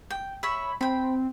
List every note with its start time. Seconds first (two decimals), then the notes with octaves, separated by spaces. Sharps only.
0.10 G5
0.43 C#5 E5 B5
0.81 C4 G5 B5